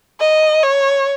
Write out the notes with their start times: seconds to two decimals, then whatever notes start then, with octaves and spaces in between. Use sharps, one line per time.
0.20 D#5
0.63 C#5